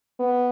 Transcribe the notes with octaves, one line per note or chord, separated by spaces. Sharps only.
B3